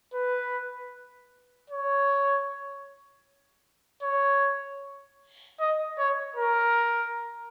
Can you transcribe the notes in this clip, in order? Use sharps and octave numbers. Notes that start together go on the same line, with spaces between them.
B4
C#5
C#5
D#5
C#5
A#4